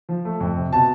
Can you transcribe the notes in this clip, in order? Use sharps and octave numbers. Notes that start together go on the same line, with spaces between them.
F3
A3
F2
C3
B2 A5